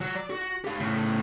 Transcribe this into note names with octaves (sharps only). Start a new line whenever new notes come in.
F#3 F#4
D5
F#4
G4 F5
A2 C#3